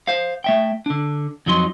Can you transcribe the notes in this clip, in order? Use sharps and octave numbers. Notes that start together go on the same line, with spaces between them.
C5 F5
A3 E5 G5
D3 D4
F2 F3 F#3 D#4 C6